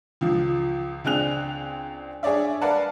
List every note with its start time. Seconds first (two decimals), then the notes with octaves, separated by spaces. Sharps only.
0.21 C#2 F3
1.04 C#2 C4 D4 G#4 F#6 F7
2.23 D4 G#4 C#5 D5 E5
2.61 A#4 B4 D5 F5 F#5 A5